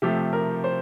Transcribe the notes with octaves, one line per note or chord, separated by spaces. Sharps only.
C3 F3 A3 G4
A#4
C5